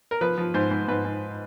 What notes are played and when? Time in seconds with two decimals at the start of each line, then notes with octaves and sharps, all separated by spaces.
0.11 A#4
0.21 F3 B4
0.38 F3
0.54 G#2 C5
0.71 G#2
0.88 G#2 B4
1.05 G#2